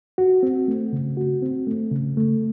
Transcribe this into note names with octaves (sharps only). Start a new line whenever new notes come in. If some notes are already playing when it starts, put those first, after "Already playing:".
F#4
C4
A3
C#3
F#4
C4
A3
C#3
A3